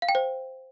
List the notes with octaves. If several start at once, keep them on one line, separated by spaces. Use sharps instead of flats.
F5
G5
C5